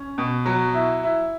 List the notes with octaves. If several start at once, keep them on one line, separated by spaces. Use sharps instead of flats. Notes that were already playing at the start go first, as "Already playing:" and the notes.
Already playing: C#4
B2
F#3
E4
E4